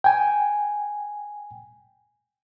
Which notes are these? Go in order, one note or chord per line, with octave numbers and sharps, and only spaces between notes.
G5 G#5